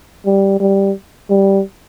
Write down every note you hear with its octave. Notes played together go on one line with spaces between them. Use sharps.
G3
G3
G3